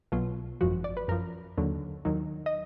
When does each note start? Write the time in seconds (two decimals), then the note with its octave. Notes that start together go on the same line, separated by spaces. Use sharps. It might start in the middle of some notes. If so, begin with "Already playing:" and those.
0.12 B1 B2 F#3 F4
0.61 G#1 F#2 F3 F#4
0.84 D5
0.97 B4
1.08 F#2 F3 A#4
1.58 D#2 D3 F#3
2.05 D#2 D#3 F#3
2.46 D#5